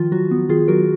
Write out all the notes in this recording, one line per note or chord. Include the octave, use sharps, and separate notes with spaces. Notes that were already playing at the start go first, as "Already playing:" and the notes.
Already playing: D#3 F3 F4
F#3 F#4
B3
D#3 F4 G#4
F#3 F#4 A#4